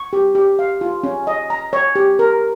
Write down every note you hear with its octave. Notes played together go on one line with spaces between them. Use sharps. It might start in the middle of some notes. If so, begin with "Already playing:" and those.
Already playing: C#6
G4
G4
F5
F4
C#4
D#5
A#5
C#5
G4
A#4